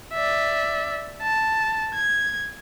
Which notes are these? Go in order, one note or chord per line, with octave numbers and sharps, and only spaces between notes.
D5 E5
A5
G#6